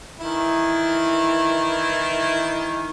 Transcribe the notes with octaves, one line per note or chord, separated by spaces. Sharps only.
D#3 E3 E4